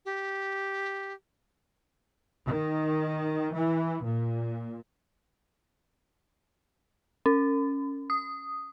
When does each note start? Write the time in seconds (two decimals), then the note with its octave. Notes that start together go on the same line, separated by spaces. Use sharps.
0.05 G4
2.46 D#3
3.54 E3
4.05 A#2
7.26 C#4
8.10 D#6